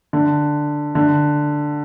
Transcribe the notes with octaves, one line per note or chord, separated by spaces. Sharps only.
D3
D3